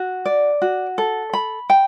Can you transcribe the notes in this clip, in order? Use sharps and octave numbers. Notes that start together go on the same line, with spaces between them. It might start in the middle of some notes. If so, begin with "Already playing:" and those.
Already playing: F#4
D5
F#4
A4
B5
G5